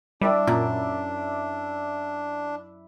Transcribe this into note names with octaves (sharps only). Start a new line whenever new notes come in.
G3 D4 E4 D5 E5
F#2 A#2